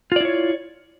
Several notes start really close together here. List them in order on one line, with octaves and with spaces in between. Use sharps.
F4 D5 E4 C#5